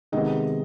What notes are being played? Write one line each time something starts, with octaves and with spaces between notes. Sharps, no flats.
C3 D#3 G#3 B3 D#5